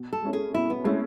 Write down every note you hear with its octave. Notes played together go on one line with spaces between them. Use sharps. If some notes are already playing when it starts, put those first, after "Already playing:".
Already playing: B2
A4
G#3 C#4 E4
G#4
B2 E4
B3
G#3 A3 C#4 E4